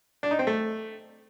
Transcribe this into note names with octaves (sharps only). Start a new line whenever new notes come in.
D4
D#4
C4
A3